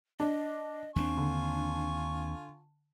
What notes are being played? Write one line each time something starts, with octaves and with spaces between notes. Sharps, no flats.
D4 D#5
D#2 G3 C4 D4 F4 G#5 C#6
D3